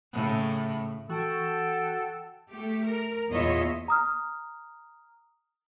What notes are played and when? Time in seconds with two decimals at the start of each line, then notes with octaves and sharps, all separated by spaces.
0.13 A2 C#3
1.09 E3 F#4 A4 G5 A5
2.51 A3 G4
2.85 A#4
3.30 E2 A#2 F4 C#5 D#5 E5
3.88 A#5 D#6 F6